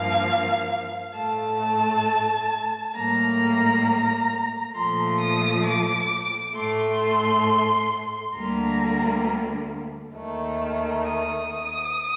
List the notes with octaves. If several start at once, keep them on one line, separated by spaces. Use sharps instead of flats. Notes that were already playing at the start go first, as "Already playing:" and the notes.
Already playing: G2 F3 A#3 F5
A2 A3 A5
A2 G3 A#3 A#5
A#2 F3 A3 C6
D#6
D6
A2 A3 C6
D2 D3 G3 A#3 A#5
D#2 D#3 A3
D#6